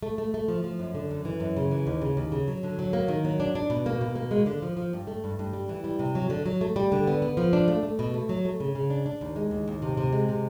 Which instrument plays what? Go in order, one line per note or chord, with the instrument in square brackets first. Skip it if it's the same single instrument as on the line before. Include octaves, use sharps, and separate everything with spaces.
[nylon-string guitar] A3
A3
A3
F3
F3
F#2
D3
F#2
E3
F#2
C#3
E3
D#2
C#3
D#2
C#3
F#3
D3
F#3
A#3
D#3
F#3
D4
D4
B2
A#3
B2
A#3
G#3
D3
F3
F3
G2
A3
G2
G2
G3
E3
G3
C3
F#3
D3
F#3
A3
G3
D3
B3
B3
F3
D4
A3
A3
B2
A3
F#3
A3
C#3
C#3
D4
D4
D#2
G#3
D#2
D#2
C3
C3
G#3
C3